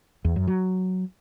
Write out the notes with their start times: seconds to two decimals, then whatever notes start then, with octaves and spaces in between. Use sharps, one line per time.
0.25 E2
0.36 F#2
0.48 F#3